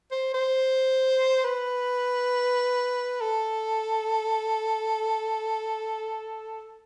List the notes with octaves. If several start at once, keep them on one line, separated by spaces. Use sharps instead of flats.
C5
C5
B4
A4